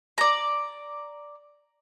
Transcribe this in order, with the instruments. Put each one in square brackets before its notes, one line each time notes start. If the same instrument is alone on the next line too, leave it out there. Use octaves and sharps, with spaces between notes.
[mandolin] D5 A#5